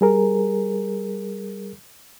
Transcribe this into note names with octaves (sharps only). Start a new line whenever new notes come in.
G3 G#4 A#4